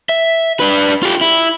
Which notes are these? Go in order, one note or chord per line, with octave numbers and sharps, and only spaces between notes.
E5
D4 B4
F4 G4
E4